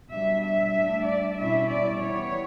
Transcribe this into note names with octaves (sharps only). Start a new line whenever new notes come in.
B2 G3 D4 E5
E5
A2 G3 D4
D5
B2 G3 C#4 E4 E5
D5
E3 G3 B3 E4 C#5